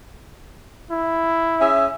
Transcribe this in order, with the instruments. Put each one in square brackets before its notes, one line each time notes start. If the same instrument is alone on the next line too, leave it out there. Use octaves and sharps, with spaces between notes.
[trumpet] E4
[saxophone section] C#4 G#4 E5